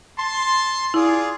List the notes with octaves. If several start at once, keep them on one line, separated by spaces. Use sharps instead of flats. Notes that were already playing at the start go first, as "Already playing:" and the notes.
A5 C6
E4 F4 G#4 D5